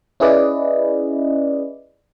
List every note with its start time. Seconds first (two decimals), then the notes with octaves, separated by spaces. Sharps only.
0.20 C#4 E4 G#4 B4 D5 D#5